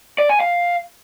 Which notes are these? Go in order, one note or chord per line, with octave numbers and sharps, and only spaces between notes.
D5
G#5
F5